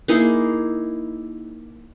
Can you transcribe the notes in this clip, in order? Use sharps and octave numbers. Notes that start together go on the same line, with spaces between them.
A#3 D#4 E4 G#4